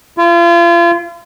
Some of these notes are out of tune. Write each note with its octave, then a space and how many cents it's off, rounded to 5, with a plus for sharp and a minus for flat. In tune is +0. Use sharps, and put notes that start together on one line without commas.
F4 -35